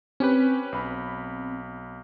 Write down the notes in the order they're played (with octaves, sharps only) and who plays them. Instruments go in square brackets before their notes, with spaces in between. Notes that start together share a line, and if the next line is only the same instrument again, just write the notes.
[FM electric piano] C4 [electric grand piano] C#4 G4 B4
[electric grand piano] B1 B5